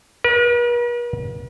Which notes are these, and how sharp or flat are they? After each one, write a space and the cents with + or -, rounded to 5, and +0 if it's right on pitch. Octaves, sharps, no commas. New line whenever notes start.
B4 -45